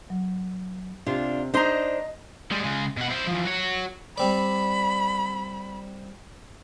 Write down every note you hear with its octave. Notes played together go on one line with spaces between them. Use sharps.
F#3
C3 D4 F4
D4 D#4 C5 D#5 A#5
G3 G#3
C#3 G#3
B2 F#5
E4 C5
E3 F3
F#4 C#5
G3 C4 D5 B5